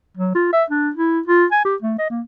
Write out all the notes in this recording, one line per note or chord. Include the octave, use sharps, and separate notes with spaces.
F#3
F4
E5
D4
E4
F4
G#5
G4
A3
D#5
A#3